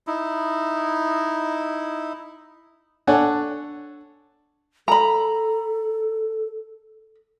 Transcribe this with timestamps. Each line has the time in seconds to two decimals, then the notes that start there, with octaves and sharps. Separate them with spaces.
0.07 D#4 E4
3.07 D4 A4 C#5 D5 F#5 G#5
4.88 A4 A#5 B5